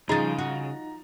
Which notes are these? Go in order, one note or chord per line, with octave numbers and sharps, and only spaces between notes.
C#3 F3 D#4 G#4 A#5 A6
F#4